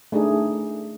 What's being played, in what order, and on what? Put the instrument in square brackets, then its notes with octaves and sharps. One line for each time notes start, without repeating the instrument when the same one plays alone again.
[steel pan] A3 D4 D#4 G#4